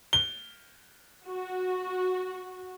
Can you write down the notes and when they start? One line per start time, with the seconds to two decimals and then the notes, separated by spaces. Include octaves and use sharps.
0.13 G7
1.25 F#4